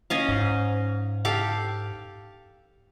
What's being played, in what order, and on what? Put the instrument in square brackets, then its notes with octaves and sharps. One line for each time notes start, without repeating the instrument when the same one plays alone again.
[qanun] C#4 D#5 F5
[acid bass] G#2
[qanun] G4 A4 F5